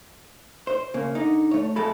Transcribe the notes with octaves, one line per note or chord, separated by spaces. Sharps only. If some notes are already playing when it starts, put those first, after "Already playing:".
C5
C#3 A#3
D3 D#4
A3 C#5
F2 G#3 A3 A4 B5